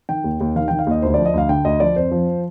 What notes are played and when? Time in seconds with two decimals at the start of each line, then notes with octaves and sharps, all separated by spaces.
0.09 D#3 G5
0.24 D#2
0.40 D#2
0.56 D#3 F5
0.68 D#3 G5
0.79 F5
0.86 D#2 D#5
1.02 D2 C5
1.14 F3 D5
1.25 D#5
1.34 D2 F5
1.49 D3 G5
1.65 D2 D#5
1.80 F3 D5
1.96 F2 C5
2.12 F3